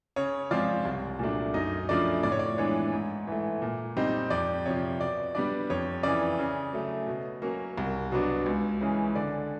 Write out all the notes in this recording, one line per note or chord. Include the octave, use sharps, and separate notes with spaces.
C#3 C#5
F3 G#3 C4 F4 D5
C2
A#2 F#3 A3 D4
F#2 D#4 D#5
C#3 F3 A3 D4 D5
A2 D5
C#5
D5
E3 G#3 B3 D4 C#5
G#2
E3 A3
A#2
G3 C4 D#4
F2 D5
C3 F3 C#5
B2 D5
G3 B3 D4 D5
F2 C#5
C#3 E3 D5
C#3
F#3 A3
B2
F#3 A#3 C#4
C2
B2 F#3 B3 D4
C#2
C#3 E3 G#3 C#4
D3 D5